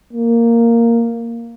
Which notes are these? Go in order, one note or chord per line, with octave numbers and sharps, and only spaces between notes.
A#3